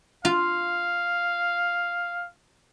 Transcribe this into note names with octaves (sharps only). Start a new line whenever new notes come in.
F4 F5